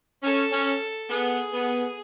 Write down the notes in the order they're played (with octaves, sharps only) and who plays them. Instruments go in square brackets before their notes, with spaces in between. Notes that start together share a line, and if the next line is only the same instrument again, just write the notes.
[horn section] C#4 [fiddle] A4
[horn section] C#4
[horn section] B3 [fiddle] G#4
[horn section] B3